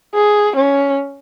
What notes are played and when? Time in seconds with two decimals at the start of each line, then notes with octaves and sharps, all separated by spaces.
0.15 G#4
0.56 C#4